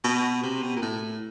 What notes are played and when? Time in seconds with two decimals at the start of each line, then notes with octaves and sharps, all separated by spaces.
0.04 B2
0.43 C3
0.62 B2
0.76 A#2
0.82 A2